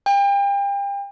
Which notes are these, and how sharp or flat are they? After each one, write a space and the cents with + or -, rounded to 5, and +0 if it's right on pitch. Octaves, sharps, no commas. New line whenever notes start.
G5 +35